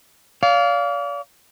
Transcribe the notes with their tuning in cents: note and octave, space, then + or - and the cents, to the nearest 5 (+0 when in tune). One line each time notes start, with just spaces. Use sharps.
D5 -40 F5 +0